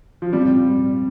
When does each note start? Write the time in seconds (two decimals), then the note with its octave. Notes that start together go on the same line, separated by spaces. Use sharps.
0.22 F3
0.33 G3 C4